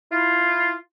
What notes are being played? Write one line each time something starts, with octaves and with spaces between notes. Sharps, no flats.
E4 F4